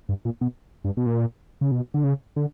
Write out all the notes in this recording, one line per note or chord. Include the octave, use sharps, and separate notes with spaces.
G2
A#2
B2
G2
B2
A#2
C#3
B2
D3
C#3
D3